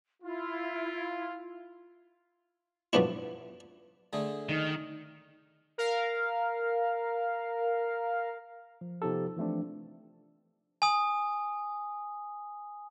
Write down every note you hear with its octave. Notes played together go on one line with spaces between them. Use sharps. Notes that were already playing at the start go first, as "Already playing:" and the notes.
E4 F4
F#2 F3 B3 D4 E4
D3 A3 G#4
D#3
A#4 F5
F3
C3 F3 B3 D#4 G4 A4
E3 F3 A3 C4 D4
G#5 D#6